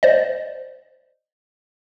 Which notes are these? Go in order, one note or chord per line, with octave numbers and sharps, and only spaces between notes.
C5 D5 D#5